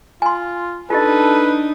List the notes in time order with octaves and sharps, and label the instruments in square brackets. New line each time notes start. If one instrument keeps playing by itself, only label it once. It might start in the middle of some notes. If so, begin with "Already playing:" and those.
[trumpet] F4 [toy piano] G#5 C6
[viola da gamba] D4 D#4 [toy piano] F4 G4 D#5 [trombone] A4 [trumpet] B4